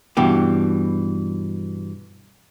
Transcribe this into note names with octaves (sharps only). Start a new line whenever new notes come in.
G2 B2 E3 G4